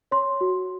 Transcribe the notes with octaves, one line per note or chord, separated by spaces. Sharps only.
C#5 C6
F#4